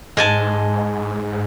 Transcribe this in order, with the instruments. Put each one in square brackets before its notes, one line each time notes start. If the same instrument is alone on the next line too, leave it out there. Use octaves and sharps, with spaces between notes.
[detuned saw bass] G#2 [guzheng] G#3 G#5 A5